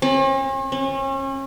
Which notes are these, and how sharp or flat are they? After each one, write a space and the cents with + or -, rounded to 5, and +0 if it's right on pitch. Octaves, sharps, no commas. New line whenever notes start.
C#4 -45
C#4 -35